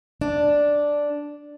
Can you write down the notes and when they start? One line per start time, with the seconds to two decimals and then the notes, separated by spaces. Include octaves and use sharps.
0.21 D4